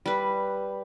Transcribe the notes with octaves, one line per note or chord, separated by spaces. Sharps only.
G3 B4